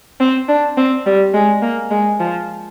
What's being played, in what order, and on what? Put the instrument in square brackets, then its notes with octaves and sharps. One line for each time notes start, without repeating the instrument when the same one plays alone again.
[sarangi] C4
D4
C4
G3
G#3
A#3
G#3
F3